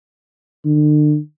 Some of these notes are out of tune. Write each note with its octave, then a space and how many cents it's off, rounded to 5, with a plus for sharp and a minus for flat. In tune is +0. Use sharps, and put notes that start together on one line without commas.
D3 +40